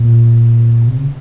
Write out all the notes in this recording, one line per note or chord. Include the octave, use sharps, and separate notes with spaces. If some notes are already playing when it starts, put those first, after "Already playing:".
Already playing: A#2
C3
C#3